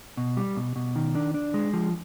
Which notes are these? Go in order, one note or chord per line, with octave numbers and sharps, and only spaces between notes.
B2
G3
B2
B2
D#3
D4
D4
G#3
F3